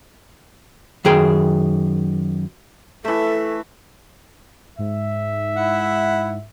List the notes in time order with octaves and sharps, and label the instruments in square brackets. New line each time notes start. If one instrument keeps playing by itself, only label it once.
[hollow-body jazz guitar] F#2 D#3 G#4 G5
[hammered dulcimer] E3 A3 [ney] A4 [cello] E5
[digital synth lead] G#2 [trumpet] E5
[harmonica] E4 F#5